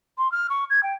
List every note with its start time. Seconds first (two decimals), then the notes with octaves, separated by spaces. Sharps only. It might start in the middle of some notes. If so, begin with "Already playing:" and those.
0.18 C6
0.32 F6
0.50 C#6
0.70 G#6
0.83 G5